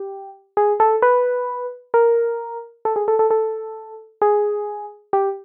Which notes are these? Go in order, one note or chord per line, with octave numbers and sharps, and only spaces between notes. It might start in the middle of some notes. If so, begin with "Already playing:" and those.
Already playing: G4
G#4
A4
B4
A#4
A4
G#4
A4
A4
A4
G#4
G4